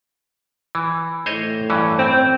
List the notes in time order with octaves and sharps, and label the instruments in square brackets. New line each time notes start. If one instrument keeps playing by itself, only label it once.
[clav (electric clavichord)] E3
[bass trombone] A2 [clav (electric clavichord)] C5 C#5 D#5
[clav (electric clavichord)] G2 E3 C#4
[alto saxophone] C4 [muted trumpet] G5